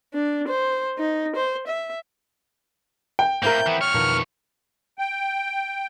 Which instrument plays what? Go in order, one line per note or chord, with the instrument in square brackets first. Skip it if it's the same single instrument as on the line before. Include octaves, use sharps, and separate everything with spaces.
[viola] D4
C5
D#4
C5
E5
[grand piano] G5
[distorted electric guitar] A2 A#3 [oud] C4 E4 A#4 [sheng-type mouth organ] G6
[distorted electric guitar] E3 B3
[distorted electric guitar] E2 C#5 [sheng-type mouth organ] F6
[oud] F2 B2 D#3
[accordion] G5